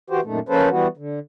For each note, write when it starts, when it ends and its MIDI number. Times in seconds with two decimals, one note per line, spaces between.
0.10 0.20 52
0.10 0.20 66
0.10 0.20 67
0.10 0.20 72
0.23 0.39 42
0.23 0.39 46
0.23 0.39 51
0.23 0.39 57
0.49 0.69 53
0.49 0.69 58
0.49 0.69 61
0.49 0.69 69
0.49 0.69 71
0.49 0.69 72
0.70 0.87 52
0.70 0.87 55
0.70 0.87 59
0.70 0.87 66
0.97 1.19 50